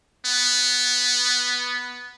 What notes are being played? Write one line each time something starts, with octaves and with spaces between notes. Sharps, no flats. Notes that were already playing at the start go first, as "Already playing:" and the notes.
B3